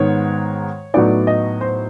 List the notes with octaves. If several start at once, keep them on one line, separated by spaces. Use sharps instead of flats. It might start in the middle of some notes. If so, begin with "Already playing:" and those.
Already playing: G#2 D#3 G#3 B3 C#5
A2 F#3 B3 D#4 D5
D#5
C5